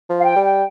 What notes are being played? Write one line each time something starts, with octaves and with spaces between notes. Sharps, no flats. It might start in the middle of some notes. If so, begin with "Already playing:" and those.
F3
F5
G5
G3
G5